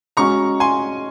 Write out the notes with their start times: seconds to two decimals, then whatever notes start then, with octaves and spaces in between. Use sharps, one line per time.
0.17 G#3 C#4 F#4 A#5 C#6
0.60 G#5 C6